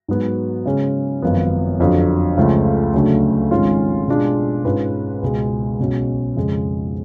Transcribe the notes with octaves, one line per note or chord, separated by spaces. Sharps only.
G#2 F#3 B3 F#4
C#3 G#3 C#4
G#1 F#2 F3 B3
F2 D3 F#3
C#2 C#3 F3 A3 F4
D2 C#3 F#3 A3 D4
G#1 G#2 G#3 C#4 F4
B2 G#3 D4 F4 G#4
G#2 G#3 C#4 F4 B4
C#2 B2 G#3
B1 B2 G#3 C#4
F2 C#3 G#3